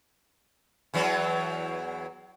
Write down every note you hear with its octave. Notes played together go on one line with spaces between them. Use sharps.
E2 E3 F#3